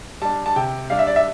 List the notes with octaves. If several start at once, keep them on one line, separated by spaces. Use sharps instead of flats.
G3 D4 A5
A5
C3 G5
G3 D4 F5
E5
D5
E5